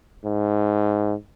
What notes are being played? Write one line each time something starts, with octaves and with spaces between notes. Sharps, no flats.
G#2